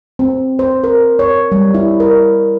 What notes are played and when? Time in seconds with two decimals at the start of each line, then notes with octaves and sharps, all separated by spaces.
0.19 C4
0.59 C5
0.84 A#4
1.19 C#5
1.52 G3
1.74 E4
2.00 A#4